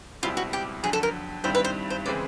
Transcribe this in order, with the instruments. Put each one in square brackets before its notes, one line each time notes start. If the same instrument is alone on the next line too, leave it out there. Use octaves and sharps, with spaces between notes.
[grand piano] C#2 B2 G3 C4 E4 [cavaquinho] F4
[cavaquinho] F#4
G4
[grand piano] F2 D3 F#3 [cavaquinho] G#4
[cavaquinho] A4
A#4
[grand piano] G2 D#3 G3 C4 E4 [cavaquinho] C5
[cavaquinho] B4
C5
C5
[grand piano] C#3 E3 G#3 C4 [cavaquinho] D5